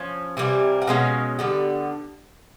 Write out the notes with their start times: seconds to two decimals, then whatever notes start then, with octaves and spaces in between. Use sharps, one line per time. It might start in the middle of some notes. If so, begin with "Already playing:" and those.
Already playing: F3 C#4
0.37 C3 E3 G3 A#3
0.82 F#5
0.87 B2 G#3 C#4 F5
1.39 D3 G3 B3